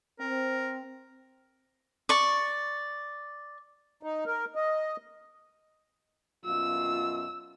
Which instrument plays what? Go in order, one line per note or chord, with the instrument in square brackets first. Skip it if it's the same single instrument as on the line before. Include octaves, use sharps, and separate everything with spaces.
[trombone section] C4 [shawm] A#4
[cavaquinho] D5 C#6
[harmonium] D#4
A#4
D#5
[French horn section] F#2 B2 F4 [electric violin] E6